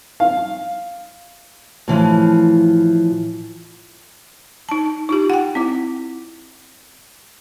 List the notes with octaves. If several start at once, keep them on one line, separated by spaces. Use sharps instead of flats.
F5
A2 E3 F3
D#4 A5
D#4 F4 G4
F#5 G5
C4 E4